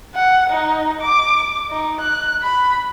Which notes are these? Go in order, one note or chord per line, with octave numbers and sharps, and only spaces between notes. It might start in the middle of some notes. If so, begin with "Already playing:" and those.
F#5
D#4
D6
D#4
F#6
B5